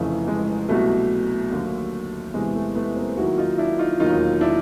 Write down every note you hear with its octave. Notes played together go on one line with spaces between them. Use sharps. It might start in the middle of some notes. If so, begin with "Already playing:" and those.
Already playing: F1 F2 C#3 E3 A3
G#3
C2 B2 F#3 A3
D#2 D3 F#3
E2 C3 E3 G#3
A3
A3 B3
A#3 C4
D#2 D#3 F#3 E4 F#4
D#4 F4
D4 E4
D#4 F4
E1 D#2 D#3 F#3 D#4 F4
D4 E4